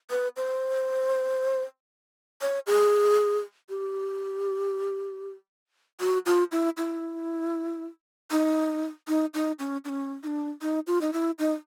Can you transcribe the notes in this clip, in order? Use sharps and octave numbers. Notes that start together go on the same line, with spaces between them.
B4
C5
C#5
G#4
G4
F#4
F4
E4
E4
D#4
D#4
D#4
C#4
D4
C#4
D#4
D4
D#4
F4
D#4
E4
D#4